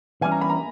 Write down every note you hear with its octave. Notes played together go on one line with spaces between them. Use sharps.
E3 G3 C#4 G#5
A#5
B5
A#5